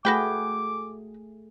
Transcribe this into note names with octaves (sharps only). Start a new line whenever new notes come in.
A3 F#4 G#4 B4 G5 D6